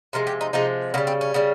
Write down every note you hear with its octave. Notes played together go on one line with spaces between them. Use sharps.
C3 F3 G#3 A#4
G4
D#4
C3 F3 G#3 D#4
C#3 G3 A#3
C4
C#4
C#3 G3